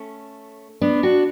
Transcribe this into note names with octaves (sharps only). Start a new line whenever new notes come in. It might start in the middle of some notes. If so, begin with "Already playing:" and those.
Already playing: A3 C#4
B3 D4
D4 F#4